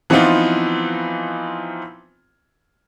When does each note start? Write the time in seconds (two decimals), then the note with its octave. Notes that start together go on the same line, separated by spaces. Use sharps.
0.10 E3 F3 B3 C4 D#4 F4